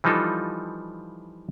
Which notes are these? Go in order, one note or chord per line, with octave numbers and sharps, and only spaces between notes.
E3 F3 G3 D#4 F4 A4